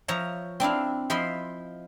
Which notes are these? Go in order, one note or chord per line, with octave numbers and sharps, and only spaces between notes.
F3 C#5 E5 A#5
C4 D4 E4 F5
F3 E4 D#5 B5 C6